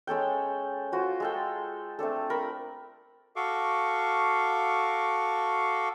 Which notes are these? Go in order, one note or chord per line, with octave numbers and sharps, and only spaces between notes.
G#3 C#4 A4 G5
F4 F#4 C5
G#3 A4 G5
A3 C4 D4 A4
A#4 B5
F#4 A4 F5 C#6 D6